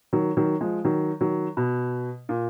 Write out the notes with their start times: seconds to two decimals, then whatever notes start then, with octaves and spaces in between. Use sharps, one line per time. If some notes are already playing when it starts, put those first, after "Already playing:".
0.13 D#3 F#3
0.37 D#3 F#3
0.61 F3 G#3
0.85 D#3 F#3
1.21 D#3 F#3
1.57 B2
2.29 A#2